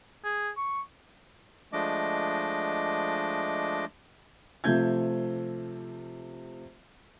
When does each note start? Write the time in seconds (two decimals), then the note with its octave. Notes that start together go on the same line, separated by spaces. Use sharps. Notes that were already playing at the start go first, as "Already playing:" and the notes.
0.24 G#4
0.57 C#6
1.73 F3 G#3 A3 D4 D#5 D6
4.64 C3 F3 A3 F4 G6 G#6